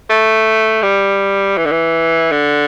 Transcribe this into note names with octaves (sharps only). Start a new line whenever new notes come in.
A3
G3
E3
D3
E3
D3